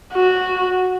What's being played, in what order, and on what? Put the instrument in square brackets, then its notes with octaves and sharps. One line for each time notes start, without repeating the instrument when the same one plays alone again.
[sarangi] F#4